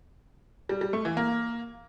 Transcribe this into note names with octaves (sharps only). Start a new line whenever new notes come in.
G3
G3
A3
E3
A#3